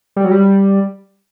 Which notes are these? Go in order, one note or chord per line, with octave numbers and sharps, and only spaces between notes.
G3
F#3
G3